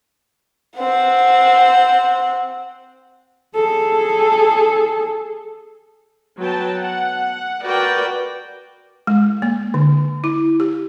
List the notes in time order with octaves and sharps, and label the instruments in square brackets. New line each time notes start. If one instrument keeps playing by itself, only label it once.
[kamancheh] C4 F#5
[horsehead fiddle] G#4 A4
[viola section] F#3 B3 G5 A5
F#5
F#4 A#4 B4 D5 G5
[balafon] G#3
A#3
D3
E4
G4